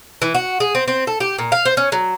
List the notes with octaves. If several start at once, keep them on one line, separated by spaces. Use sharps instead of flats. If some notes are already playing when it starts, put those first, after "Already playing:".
E3
F#4
G#4
C4
C4
A4
G4
A#2
F5
C5
C#4
F#3